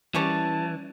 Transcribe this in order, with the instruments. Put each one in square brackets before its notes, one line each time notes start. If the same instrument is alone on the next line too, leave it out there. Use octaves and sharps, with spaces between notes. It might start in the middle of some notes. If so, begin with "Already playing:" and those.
[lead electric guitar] E3 [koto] G3 C#4 C#5 [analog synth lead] A5